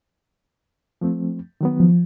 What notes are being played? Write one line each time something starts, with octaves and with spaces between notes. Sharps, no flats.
F3 A3 C4
D#3 F#3 B3
F3